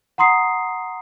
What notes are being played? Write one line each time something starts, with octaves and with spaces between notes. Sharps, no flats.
F#5 A#5 C6 D#6 C7